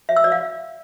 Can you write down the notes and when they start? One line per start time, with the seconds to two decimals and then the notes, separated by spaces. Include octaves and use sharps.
0.09 E5
0.16 E6
0.24 D5
0.32 F5